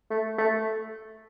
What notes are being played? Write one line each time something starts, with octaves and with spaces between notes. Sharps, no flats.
A3
A3